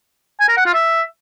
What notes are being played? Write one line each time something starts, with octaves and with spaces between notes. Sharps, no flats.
G#5
A#4
F#5
F4
E5